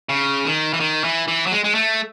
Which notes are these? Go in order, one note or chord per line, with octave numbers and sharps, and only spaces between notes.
C#3
D#3
E3
D#3
E3
E3
F#3
G#3
G#3
A3